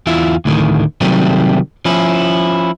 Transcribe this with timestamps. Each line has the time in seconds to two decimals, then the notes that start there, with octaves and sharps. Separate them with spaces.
0.07 E2 E4 F4 E5
0.45 D2 A2 D3 D#3
1.01 C3 D#3 F#3 G3 A3 C4
1.85 F3 C#4 E4